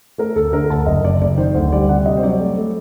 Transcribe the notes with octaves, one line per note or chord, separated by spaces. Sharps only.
A3 A#4
D2 A4
D3 A#4
D2 A5
F#1 D#5
F#1 D5
F#1 D5
D#3 C5
D2 C5
G3 D5
C3 F#5
G3 D#5
C5
F#3 D5
A3
A3